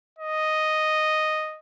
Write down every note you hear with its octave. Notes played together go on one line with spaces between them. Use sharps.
D#5